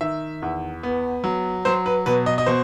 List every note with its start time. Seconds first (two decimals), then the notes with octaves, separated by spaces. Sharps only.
0.01 D#3 E5
0.42 E2
0.83 B3
1.24 F#3
1.65 F#3 C5
1.86 B4
2.06 B2 B4
2.26 D#5
2.38 D#5
2.46 B2 C5